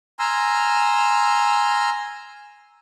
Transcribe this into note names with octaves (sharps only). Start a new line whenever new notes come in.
G#5 A#5 C6 E6 F6